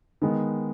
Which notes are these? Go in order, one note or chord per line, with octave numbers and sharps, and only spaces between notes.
D#3 G#3 B3